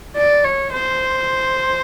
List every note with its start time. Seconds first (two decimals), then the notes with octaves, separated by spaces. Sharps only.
0.16 D5
0.45 C#5
0.72 C5